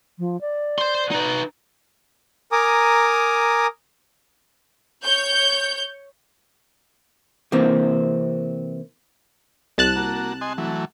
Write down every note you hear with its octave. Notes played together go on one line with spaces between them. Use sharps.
F3
D5
C5 C6
D#4 B4
A#4 G#5 A#5 D6 D#6
C#5 G6
C3 E3 A#3 C4
C2 A5 F#6
A#3 F#4
D#5 G#5 C6
E3 F#3 A3